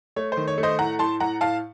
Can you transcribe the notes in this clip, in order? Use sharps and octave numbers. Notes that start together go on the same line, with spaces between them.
A3 C#5
C5
D#3
C#5
A3
C5 D#5
A2 F#5 A#5
A2 A5 C6
A2 F#5 A#5
A2 F5 A5